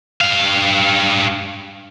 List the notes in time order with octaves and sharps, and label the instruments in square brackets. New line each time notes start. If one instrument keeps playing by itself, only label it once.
[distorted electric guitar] G2 F5